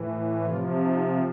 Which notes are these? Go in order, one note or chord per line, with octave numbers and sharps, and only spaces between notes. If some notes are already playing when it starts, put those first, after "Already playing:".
Already playing: A2 E3
C3 F3 F4
D#4